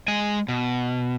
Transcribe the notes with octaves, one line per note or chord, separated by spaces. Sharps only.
G#3 G#5
B2